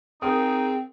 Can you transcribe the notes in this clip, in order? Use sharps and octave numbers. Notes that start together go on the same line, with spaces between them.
C4 D#4 G#4 A#4 D#6